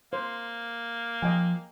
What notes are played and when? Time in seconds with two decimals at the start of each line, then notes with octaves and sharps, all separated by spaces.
0.13 A#3 C5
1.22 F3 D#5 G5 G#5